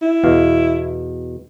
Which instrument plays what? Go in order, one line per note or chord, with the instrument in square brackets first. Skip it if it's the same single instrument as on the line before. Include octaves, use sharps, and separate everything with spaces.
[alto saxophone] E4
[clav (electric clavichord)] E2 B2 F5